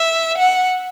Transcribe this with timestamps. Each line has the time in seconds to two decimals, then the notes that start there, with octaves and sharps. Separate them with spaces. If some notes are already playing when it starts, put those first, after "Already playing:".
Already playing: E5
0.38 F#5